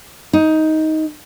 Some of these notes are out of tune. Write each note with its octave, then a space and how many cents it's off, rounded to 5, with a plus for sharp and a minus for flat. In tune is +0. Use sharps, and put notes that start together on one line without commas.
D#4 +15